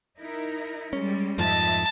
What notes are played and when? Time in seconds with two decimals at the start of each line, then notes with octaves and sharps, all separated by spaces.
0.19 D#4 E4 A#4
0.93 G3 G#3 C#4
1.38 F2 G#2 F3 D#5 E5 A5